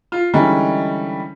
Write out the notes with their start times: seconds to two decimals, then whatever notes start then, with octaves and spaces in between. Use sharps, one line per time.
0.12 F4
0.34 D3 E3 G3 G#3 C#4 D#4